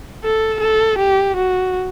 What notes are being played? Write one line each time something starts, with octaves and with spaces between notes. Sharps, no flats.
A4
A4
G4
F#4